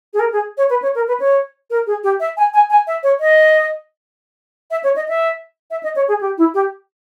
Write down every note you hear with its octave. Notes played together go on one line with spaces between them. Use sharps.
G#4
A#4
G#4
C#5
B4
C#5
A#4
B4
C#5
A#4
G#4
G4
E5
G#5
G#5
G#5
E5
C#5
D#5
E5
C#5
D#5
E5
E5
D#5
C#5
G#4
G4
E4
G4